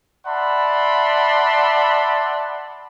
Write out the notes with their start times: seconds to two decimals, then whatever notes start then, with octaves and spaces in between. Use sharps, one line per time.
0.27 D5 E5 F#5 A5 B5 C6